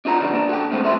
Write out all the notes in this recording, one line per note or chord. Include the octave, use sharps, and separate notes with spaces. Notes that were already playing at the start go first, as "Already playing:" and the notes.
D4 D#4 F4 F#4 A#5
C#3 E3 G3 B3 D4
A#3 D4
F#4 A4 G5
A#2 C#3 G#3 A3 B3 C4
F#2 F3 A3 E5 G5 C6